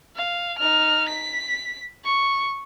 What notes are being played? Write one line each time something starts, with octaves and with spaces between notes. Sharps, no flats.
F5
D#4 F6
B6
C#6